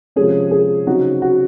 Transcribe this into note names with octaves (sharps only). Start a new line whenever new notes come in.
C3 F3 G#3 C#4 G#4
G#4
C#3 F#3 C4 D#4 F#4
F#4